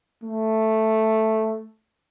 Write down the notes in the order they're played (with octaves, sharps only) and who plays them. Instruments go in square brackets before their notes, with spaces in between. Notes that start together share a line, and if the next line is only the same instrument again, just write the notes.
[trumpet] A3